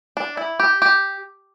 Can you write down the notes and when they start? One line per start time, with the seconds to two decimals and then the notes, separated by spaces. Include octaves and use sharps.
0.17 D4
0.37 E4
0.60 G4
0.82 G4